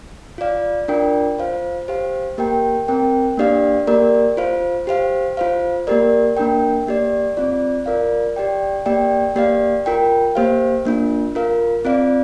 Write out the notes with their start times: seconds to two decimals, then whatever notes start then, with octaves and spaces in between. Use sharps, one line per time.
0.38 F4 D5 F5
0.88 D4 F4 A#4 D5 G5
1.39 F4 C5 F5
1.88 G4 C5 F5
2.38 A#3 G4 A#4 G5
2.88 C4 A#4 G5
3.37 A#3 D4 G4 D5 F5
3.87 A#3 G4 A#4 D5
4.37 F4 C5 F5
4.87 G4 C5 F5
5.37 F4 C5 F5
5.87 A#3 G4 A#4 D5
6.37 A#3 D4 A#4 G5
6.87 A#3 G4 D5
7.37 C4 F4 D5
7.86 F4 A#4 D5 F5
8.36 G4 D5 G5
8.86 A#3 G4 D5 G5
9.36 A#3 G4 D5 F5
9.86 F4 A#4 G5
10.35 A#3 G4 C5 F5
10.85 A#3 D4 F4
11.35 F4 A#4 F5
11.85 C4 F4 D5 F5